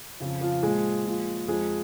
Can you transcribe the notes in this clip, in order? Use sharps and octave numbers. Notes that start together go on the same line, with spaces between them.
F2 C#3 F3
F3 F4
A#2 F3 G#3 G#4
A#2 F3
F2 F3 G#3 G#4